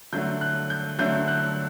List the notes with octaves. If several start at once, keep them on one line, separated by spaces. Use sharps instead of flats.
D3 F#3 A3 E4 G6
F#6
G6
D3 F#3 A3 E4 G6
F#6